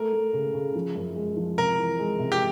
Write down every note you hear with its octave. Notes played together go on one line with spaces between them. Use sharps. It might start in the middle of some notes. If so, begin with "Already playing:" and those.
Already playing: A3 A#4
A3
C#3
C#3
F3
F#2
G#3
F3
C3 A#4
E3
G#3
C3
G4